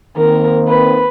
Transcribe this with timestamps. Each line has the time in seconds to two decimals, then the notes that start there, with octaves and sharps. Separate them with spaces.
0.17 D#3 A#3 C4 A#4
0.68 B4